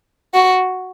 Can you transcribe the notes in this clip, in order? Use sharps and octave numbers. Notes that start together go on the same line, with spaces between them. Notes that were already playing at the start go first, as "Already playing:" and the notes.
F#4